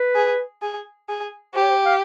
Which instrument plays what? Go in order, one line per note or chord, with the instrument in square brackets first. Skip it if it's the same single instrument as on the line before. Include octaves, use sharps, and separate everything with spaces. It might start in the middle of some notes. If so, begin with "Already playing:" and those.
Already playing: [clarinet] B4
[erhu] G#4
G#4
G#4
[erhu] G4 [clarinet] C5
[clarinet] C#5
C5
F5